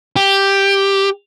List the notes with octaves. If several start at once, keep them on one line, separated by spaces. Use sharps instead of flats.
G4